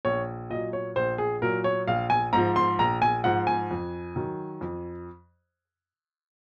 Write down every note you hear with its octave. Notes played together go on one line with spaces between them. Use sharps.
A#1 C#5
A#2 F#3 D#5
C#5
A#1 C5
G#4
A#2 F#3 A#4
C#5
A#1 F5
G#5
G#2 F3 A#5
C6
A#1 A#5
G#5
G#2 F3 F#5
G#5
F2
D#3 F#3
F2